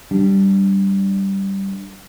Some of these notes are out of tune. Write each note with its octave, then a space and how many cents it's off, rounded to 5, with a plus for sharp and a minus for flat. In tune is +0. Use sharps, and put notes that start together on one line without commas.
G3 -10 D4 +0